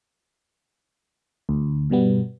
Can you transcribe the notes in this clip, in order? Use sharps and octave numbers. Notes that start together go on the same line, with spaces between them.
D2
G2 B2 G3 B3